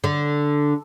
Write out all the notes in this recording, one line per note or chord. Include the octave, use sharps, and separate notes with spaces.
D3